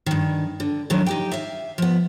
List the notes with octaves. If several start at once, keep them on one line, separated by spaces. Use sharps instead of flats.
G2 D#3
D3
A2 D3 D#3 F#3
D#4 G4 G5
E5 F5
F3 B3